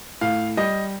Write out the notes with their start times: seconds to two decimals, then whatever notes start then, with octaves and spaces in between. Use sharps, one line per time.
0.21 A2 F5
0.57 G3 D#5